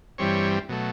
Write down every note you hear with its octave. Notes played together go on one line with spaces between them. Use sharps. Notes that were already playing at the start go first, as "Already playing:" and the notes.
G2 E3 G3 C4 C#5
B2 F#3 A3